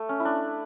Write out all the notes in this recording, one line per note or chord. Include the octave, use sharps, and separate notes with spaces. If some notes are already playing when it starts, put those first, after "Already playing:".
Already playing: A3
C#4
E4
D4